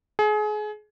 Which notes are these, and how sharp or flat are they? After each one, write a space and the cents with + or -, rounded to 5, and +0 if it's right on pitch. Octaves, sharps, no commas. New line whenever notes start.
G#4 +30